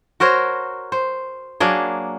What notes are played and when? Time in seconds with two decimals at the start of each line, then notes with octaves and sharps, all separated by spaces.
0.20 F#4 A#4 C5 C#5
0.92 C5
1.60 F#3 A#3 D4 G#4